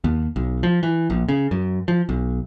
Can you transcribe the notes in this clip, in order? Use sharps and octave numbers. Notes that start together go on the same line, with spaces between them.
D#2
B1
F3
E3
A#1
C#3
F#2
F3
B1